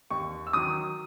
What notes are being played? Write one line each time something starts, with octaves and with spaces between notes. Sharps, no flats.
D#2 C#6
E6
D#3 F#3 D#6